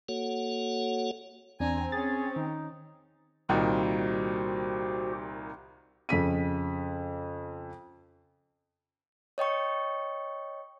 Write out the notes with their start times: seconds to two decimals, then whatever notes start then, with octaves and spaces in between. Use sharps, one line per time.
0.09 A#3 F#4 A4 C#5 F#5
1.60 E2 C4 D4 G#5 A#5
1.92 C#4 G#4 C#5 A6
2.36 D#3 D#4
3.49 C2 A#2 D#3 F#4 G4 C5
6.09 F2 C#3 B6 D#7
9.38 C#5 D#5 G5 C#6